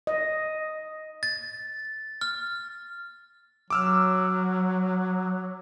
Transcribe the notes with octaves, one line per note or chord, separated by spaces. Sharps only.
D#5
A6
F6
F#3 D6 E6 F6